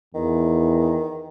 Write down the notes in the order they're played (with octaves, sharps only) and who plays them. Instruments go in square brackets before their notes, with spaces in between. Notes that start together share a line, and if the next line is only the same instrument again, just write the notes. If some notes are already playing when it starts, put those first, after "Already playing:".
[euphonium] E2 [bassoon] D#3